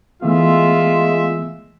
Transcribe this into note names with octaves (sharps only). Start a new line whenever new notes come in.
E3 G#3 A3 B3 F4 E5